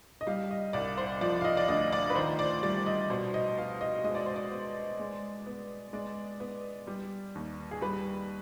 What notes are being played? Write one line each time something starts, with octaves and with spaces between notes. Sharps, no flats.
D#5
G3 F5
D#5
C2 D5
C5
F3 D5
F5
D#5
D5
D2 D#5
D5
B4
D#3 C5
D5
G3 D5
D#5
B2 C5
D#5
B3 F5
D#5
G#3 D#5
D5
C5
D5
B3
G#3
B3
G#3 D5
B3
G3
D#2
G#4
G3 B4